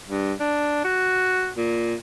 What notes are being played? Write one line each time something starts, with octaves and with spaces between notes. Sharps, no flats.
G2
D4
F#4
A#2